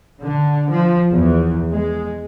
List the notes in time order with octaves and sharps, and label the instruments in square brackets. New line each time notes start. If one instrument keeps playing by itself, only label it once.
[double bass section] D3
F3
E2
G#3